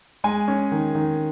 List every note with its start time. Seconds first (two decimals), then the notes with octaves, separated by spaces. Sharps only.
0.24 G#3 G#5
0.48 C#4
0.71 D#3
0.95 D#3